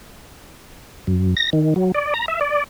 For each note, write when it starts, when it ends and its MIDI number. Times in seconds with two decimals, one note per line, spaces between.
1.07 1.35 42
1.37 1.50 94
1.53 1.74 51
1.76 1.92 54
1.95 2.14 74
2.14 2.26 82
2.28 2.40 76
2.41 2.64 74